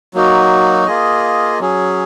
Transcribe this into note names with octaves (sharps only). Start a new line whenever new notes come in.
F#3 A#3 D#4 F#4
A#3 F4 G#4 D#5
F#3 C#4 G#4